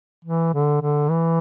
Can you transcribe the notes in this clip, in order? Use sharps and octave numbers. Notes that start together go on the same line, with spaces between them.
E3
D3
D3
E3